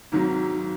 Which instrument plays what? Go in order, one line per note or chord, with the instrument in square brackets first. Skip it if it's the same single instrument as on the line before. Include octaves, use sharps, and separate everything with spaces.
[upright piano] G#1 G#2 D#3 F#3